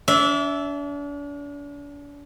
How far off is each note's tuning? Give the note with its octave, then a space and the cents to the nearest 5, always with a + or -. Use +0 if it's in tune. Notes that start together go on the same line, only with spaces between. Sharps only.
D4 -40 E5 +0